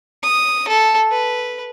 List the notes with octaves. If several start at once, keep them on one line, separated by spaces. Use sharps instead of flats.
D#6
A4
B4